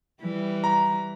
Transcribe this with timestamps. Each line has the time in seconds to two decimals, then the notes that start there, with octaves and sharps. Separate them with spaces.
0.21 E3 G3
0.64 A#5